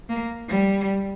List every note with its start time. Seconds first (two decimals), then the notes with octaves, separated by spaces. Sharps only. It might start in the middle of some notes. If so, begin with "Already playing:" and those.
0.09 A#3
0.49 G3